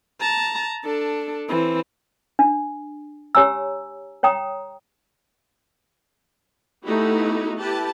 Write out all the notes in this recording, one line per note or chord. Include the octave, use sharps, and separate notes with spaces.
A5 A#5
D4 A4
E3 C4
D4
G4 C#5 G#5 A#5 E6
C#5 G5 A#5 D#6
A3 B3 D#4 E4 F#4 G4
E4 G4 B4 A5